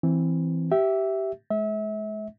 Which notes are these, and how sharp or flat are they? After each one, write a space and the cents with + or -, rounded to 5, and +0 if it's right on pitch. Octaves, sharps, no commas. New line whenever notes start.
E3 +0 C4 +0
G4 -20 E5 +0
G#3 +35 E5 -30